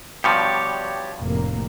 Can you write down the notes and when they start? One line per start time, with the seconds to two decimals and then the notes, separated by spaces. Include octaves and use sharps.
0.24 G2 B2 F3 G4 C#5 D5
1.21 F1 A2 A#3